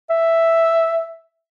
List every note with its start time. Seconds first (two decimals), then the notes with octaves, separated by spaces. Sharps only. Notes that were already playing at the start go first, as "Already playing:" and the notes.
0.10 E5